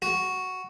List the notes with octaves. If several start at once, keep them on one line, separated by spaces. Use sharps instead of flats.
F#4